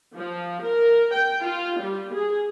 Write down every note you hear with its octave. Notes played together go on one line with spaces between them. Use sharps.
F3
A#4
G5
F4
G3
G#4